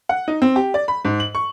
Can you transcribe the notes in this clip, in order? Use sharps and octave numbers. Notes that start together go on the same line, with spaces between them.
F#5
D#4
C4
G4
D5
B5
G#2
F#7
C#6